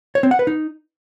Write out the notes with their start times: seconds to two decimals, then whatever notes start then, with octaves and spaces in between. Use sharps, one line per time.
0.15 C#5
0.23 C4
0.31 F#5
0.39 B4
0.47 D#4